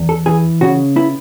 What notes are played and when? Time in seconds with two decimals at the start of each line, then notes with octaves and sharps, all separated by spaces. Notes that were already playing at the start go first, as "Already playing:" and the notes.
Already playing: E2
0.09 A4
0.26 E3 G#4
0.61 C#3 F#4
0.96 B3 E4